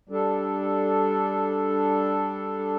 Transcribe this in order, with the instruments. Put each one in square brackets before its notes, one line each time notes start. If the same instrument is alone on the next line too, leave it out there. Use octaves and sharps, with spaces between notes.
[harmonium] G3 D4 A4